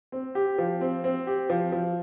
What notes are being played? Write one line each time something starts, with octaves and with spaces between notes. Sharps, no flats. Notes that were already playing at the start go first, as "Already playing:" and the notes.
C4
G4
F3
C4
C4
G4
F3
F3